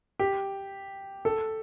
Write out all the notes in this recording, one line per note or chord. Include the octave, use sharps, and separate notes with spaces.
G4
A4